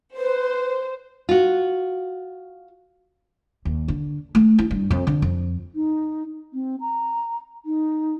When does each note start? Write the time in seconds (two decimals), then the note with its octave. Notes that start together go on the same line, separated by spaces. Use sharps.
0.17 B4 C5
1.29 F4 F#4
3.65 D#2
3.88 D3
4.35 A3
4.59 E4
4.71 G2
4.91 F2
5.07 D3
5.22 F2
5.75 D#4
6.53 C4
6.80 A#5
7.65 D#4